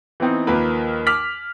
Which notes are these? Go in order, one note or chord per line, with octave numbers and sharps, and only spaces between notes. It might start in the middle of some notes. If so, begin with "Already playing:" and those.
E3 B3 C4 D#4
D#2 F3 A#3 A#4 B4
D6 F6 B6 F#7